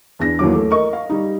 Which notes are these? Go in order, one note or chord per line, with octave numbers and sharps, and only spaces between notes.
E2 D4 A#6
D#2 E3 F#3 D6
A3
A#4 D#5 C#6
F5
G3 D#4